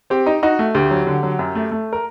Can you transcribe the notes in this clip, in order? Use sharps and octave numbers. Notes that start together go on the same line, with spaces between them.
C4 G4
D#4
D#4 F#4
A3
D2 G4
F#3
D3
F#3
F#2
A3
A3
A#4